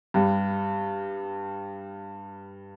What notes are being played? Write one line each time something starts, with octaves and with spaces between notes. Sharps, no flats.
G2 G3